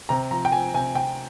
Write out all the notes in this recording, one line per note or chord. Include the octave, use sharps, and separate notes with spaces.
C3 A#5
F3 A#5
G5
F3 G#5
C3 G#5
C3 G5